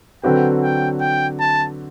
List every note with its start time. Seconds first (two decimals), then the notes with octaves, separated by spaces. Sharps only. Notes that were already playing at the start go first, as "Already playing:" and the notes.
0.24 D3 F#3 C4 F#4 B4 G5
0.62 G5
1.00 G5
1.40 A5